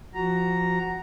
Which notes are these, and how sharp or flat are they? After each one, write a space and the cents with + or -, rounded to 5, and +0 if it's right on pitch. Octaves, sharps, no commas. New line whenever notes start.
F3 +0 F#4 +10 A#5 +0